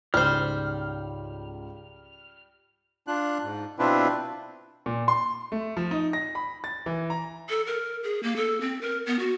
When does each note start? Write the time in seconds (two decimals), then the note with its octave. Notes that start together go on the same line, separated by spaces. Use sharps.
0.14 C#2 G#2 G3 C5 F6
3.07 D4 F4 F#6
3.44 G#2
3.79 B2 C4 D4 E4 F4 B4
4.86 A#2
5.08 C6
5.52 A3
5.77 F3
5.91 D#4
6.13 A#6
6.35 B5
6.64 A6
6.86 E3
7.10 A#5
7.49 A4
7.67 A#4
8.03 G#4
8.23 A#3
8.36 A4
8.61 C4
8.81 A#4
9.06 B3
9.19 F#4